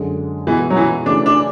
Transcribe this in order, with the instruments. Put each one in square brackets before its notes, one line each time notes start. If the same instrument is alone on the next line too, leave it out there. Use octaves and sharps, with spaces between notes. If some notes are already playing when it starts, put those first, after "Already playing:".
Already playing: [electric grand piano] F#2 D3 G#3
[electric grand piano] B2 G#3 B3 F#4 [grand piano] E3
[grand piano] F#3
E3
[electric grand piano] C#3 E3 A3 [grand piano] D4
[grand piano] D4